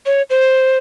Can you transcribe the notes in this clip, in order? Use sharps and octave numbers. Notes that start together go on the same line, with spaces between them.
C#5
C5